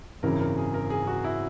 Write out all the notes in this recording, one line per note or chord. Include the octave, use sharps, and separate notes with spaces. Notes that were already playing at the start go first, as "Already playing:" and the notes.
G#1 F#2 C#3 E3 A#4
A#4
G#4
A#4
G#4
F#4
E4